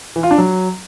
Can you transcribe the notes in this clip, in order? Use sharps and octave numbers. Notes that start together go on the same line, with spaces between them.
E3
F4
D4
F#3